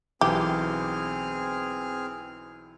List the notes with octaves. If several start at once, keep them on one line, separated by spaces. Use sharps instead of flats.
B1 E3 C4 G4 G#4 F6